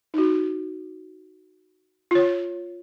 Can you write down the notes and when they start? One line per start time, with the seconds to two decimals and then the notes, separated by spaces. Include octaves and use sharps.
0.14 D#4 F#4
2.11 F4 C#5